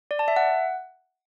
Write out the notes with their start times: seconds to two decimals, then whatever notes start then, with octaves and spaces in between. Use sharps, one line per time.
0.11 D5
0.19 A5
0.28 E5
0.36 F#5